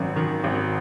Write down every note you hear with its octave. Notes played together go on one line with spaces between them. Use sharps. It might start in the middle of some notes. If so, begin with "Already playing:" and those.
Already playing: G#1 F#2 D#3
D#3
G#1